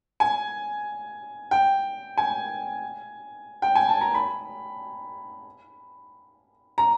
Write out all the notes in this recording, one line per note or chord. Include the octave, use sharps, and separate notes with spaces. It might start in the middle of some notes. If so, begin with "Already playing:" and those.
G#5
G5
G#5
G5
G#5
A5
A#5
B5
A#5